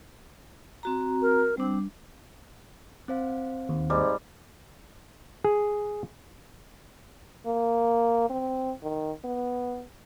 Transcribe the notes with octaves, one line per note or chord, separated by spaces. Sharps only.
C4 F#4 A#5
A#4
G3 C4 D4
C4 C5 F5
D#2
G#2 G3
G#4
A#3
C4
D#3
B3